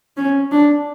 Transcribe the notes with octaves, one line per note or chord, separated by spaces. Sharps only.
C#4
D4